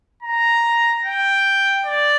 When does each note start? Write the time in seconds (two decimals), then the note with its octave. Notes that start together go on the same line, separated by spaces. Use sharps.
0.23 A#5
1.04 G5
1.86 D5